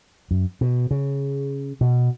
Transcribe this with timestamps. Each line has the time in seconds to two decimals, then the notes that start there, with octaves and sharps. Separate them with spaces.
0.31 F#2
0.61 B2
0.91 C#3
1.81 B2